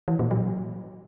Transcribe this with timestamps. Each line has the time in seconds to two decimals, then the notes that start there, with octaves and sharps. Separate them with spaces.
0.08 E3
0.19 A#2
0.31 F#3